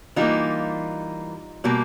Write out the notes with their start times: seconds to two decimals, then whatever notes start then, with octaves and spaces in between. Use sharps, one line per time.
0.16 E3 G3 A#3 D#4 F4
1.64 B2 G3 A#3